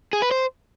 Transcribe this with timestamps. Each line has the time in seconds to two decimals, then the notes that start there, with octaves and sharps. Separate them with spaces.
0.13 G#4
0.22 B4
0.31 C5